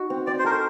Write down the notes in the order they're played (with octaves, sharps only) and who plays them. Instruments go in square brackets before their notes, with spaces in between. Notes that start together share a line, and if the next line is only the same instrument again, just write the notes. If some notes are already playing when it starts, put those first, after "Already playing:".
Already playing: [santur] D#4 F#4
C4
[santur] C4 [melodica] D5
[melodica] C5
[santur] A4 [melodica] A#4
[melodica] C5